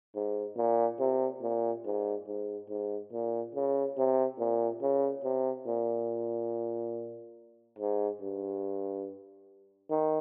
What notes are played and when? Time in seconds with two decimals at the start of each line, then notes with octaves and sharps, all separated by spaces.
0.15 G#2
0.57 A#2
1.00 C3
1.42 A#2
1.85 G#2
2.28 G#2
2.70 G#2
3.13 A#2
3.55 C#3
3.97 C3
4.39 A#2
4.82 C#3
5.24 C3
5.67 A#2
7.79 G#2
8.22 G2
9.91 D#3